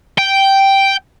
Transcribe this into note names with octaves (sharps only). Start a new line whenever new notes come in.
G5